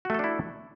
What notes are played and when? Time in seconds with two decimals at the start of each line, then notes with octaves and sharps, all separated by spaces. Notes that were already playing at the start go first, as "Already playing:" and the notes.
0.05 F#4
0.10 A3
0.14 A4
0.19 D4
0.24 E4